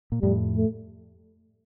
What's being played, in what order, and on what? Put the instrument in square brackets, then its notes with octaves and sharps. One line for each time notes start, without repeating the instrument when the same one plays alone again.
[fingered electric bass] A#2
[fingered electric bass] F2 A2 [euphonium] G3
[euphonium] A3